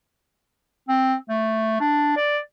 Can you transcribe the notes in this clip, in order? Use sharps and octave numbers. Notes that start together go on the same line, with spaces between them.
C4
A3
D4
D5